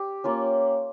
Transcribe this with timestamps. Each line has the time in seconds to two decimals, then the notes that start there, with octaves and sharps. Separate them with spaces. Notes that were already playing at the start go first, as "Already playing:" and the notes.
Already playing: G4
0.24 A#3 C#4 F4